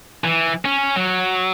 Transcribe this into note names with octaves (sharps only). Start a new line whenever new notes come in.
E3
C#4
F#3